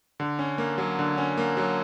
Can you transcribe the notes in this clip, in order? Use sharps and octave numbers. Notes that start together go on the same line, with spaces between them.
D3
C#4
A#3
F#3
D3
C#4
A#3
F#3